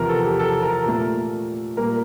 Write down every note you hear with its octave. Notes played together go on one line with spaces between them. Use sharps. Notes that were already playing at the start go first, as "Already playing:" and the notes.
Already playing: E2 C3 F3 A#4
A4
G4
A4
A#4
A#2 A3
A#2 G3 A#3 A#4